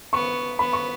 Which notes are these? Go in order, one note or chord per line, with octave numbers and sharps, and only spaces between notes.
B3 C#6
B3 B5
C#6